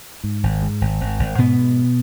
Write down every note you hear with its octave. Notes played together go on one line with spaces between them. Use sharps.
G#2
G#1
G#2
G#1
G#1
G#1
G#2 B2 B3
G#2